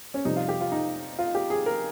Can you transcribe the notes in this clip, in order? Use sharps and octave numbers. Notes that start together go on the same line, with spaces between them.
C#4
F2 C3 G3 D#4
F4
G4
F4
D#4
F4
G4
G#4
A#4